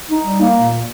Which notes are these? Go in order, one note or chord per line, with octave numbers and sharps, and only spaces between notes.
D#4
G3
A#3
A#2